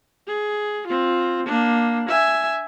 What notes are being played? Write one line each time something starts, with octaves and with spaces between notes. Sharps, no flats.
G#4
C4 F4
A#3 D4
E5 G#5